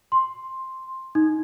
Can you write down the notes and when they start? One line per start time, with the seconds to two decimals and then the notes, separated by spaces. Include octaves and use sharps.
0.12 C6
1.15 D#4